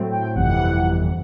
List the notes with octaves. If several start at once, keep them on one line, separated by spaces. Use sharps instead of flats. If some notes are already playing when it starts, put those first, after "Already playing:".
Already playing: A2 F#3 A3 C4
G5
G1 F2 C3 E3 F#5